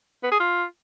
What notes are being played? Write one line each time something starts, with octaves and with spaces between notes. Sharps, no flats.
B3
G#4
F4